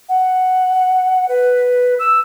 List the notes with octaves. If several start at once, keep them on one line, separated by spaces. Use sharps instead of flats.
F#5
B4
E6